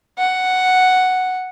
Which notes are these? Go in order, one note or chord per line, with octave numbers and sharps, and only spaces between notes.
F#5